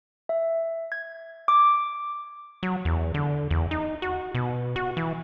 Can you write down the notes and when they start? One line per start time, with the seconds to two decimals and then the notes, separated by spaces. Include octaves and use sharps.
0.29 E5
0.92 G#6
1.48 D6
2.63 F#3
2.85 E2
3.14 D3
3.51 E2
3.71 D#4
4.02 F#4
4.35 B2
4.76 F#4
4.97 E3